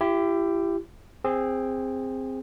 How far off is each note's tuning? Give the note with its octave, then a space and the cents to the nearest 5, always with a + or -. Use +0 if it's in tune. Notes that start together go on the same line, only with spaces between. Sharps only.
E4 +35 G4 +0
C4 +0 G#4 -20